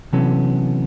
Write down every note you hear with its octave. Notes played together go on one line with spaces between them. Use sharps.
C3 E3 F#3 B3 C#4 A4